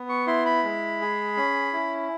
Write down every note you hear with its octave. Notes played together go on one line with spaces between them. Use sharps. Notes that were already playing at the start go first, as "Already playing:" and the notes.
Already playing: B3
C#6
E4 C6
B5
G#3
G#4
C#4
E4